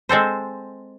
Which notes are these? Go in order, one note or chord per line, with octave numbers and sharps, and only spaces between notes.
G#3 C4 A4 C5